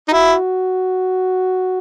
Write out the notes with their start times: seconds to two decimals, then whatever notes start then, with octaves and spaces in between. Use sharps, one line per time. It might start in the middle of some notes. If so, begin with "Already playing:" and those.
0.08 D#4
0.12 E4 F#4